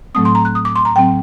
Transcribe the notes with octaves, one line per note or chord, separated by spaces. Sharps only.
A2 F#3 A3 C4 D#6
C6
A#5
F#6
D#6
D6
C6
A#5
A2 F#3 C4 G5